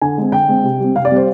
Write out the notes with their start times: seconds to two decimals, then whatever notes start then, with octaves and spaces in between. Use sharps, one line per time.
0.02 D3 G#5
0.18 G#3 C4
0.32 D3 G5
0.49 G#3 C4
0.64 C3
0.80 G3 C4
0.95 C3 F5
1.05 D5
1.11 G3 C4 C5